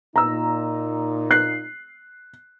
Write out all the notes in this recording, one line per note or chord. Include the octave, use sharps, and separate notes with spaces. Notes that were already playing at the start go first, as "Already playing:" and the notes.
A#2 D#4 A#5 E6
F#6 C7